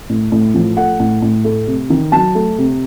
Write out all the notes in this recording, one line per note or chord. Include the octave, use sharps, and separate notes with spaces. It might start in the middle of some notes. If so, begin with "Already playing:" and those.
A2
A2
F3
A3 F#5
A2
A2
A3
C3
D#3
F#3 A5
A3
C3